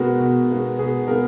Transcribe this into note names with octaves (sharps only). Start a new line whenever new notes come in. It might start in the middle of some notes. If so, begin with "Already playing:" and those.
Already playing: B2 G#3 B3 F#4 A#4
B2
G#3 B3
B2 G#4
G#3 B3 A#4